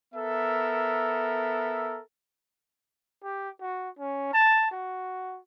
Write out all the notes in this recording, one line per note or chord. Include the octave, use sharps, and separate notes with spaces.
B3 A4 A#4 E5
G4
F#4
C#4
A5
F#4